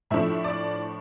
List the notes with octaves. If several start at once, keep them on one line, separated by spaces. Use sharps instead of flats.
A2 F3 A3 D4 E5
D5